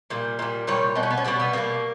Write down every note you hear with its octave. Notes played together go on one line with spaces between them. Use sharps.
A#2 G3
A#2 G3
A#2 G3 C#5
B2 G3 D#4
C#4
B3
C#4
B2 G3 B3
B3
B2 G3 A#3